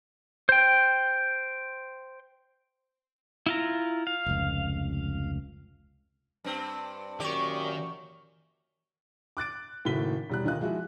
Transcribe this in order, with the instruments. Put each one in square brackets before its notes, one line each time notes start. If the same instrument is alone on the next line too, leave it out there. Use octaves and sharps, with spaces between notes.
[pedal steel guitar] C5 G5
E4 F4 A#5
F5
[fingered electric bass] F1 C#2
[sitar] G2 C4
[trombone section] F#2 A#2 [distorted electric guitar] D#3 [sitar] G4 [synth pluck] D5 C#6
[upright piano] D6 F#6 A6 D7
F#1 A2 D#3 F#4 B6 G7
E1 G3 F#6
D2 D#3 F4 D#5 F#6
F3 G#3 E4 F#4